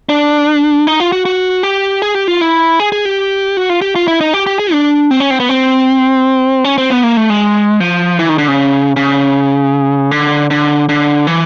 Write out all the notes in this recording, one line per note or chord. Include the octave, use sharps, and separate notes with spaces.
D4
D#4
F4
F#4
F#4
G4
G#4
G4
F4
E4
G#4
G#4
G4
F#4
F4
G4
F4
E4
D#4
G4
G4
G#4
D4
C4
C#4
C4
B3
C4
C#4
C4
B3
A#3
A3
G#3
F3
E3
D#3
D3
C#3
C#3
D3
D3
D3
E3